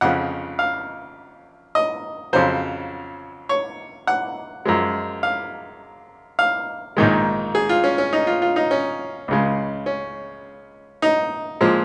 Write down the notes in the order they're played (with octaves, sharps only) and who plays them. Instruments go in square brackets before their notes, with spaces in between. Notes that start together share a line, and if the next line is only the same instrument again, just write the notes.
[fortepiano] F2 C#3 F3 F#5
F5
D#5
F2 C#3 F#3 C5
C#5
F#5
F#2 F3 G#3
F5
F5
A#1 G#2 D#3 G#3
G#4
F4
C#4
C#4
D#4
F4
F4
D#4
C#4
C#2 C#3 G#3
C#4
D#4
A#2 F3 G#3